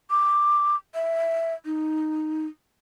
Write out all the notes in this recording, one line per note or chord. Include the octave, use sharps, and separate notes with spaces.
D6
E5
D#4